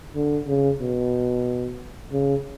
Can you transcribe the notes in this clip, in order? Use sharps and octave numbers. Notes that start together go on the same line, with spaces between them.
D3
C#3
B2
C#3